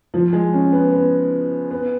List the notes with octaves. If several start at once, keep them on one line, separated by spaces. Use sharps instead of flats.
F3
G#3
C#4
B3
B3
B3